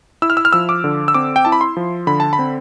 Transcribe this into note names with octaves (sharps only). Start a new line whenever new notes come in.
E4 E6
F6
E6
F6
F3 E6
D6
D3
E6
C4 D6
G5
E4 A5
B5
C6
F3
D3 B5
A5
B5
C4